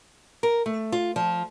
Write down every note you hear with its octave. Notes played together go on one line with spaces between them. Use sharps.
A#4
A3
F4
F3